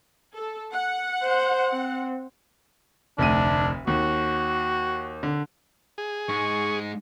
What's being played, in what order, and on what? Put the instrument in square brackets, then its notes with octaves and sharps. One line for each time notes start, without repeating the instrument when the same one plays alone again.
[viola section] A4
F#5
[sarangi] C5
C4
[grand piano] F1 D2 D#7 [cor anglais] D4
[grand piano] D#2 [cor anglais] F#4
[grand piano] D3
[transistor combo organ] G#4
[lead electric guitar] G#2 G#3 [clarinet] C#6